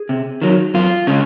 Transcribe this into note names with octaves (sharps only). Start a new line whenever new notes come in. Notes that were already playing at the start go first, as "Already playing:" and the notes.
Already playing: G#4
C3
D#3 F#3
F#2 F4
C#3 G#3 C#4